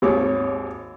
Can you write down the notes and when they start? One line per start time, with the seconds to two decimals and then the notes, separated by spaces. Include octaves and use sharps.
0.02 G#1 D#2 C#5 D6